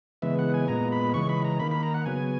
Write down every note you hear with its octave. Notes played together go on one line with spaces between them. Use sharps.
C#3 E3 G#3 B3 E5
F#5
G#5
A#2 G#3 B3 A#5
B5
C#3 E3 G#3 C#6
B5
A#5
D#3 A#3 B5
B5
A#5
F#5
C#3 F#3 B3 G#5